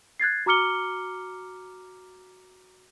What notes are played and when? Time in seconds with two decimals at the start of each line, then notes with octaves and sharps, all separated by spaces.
0.20 F#6 G#6 A6 C7
0.46 F#4 A#5 D6 F6 C#7 G7